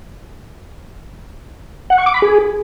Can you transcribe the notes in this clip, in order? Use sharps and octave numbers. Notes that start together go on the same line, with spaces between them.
F#5
C#6
D6
B5
G#4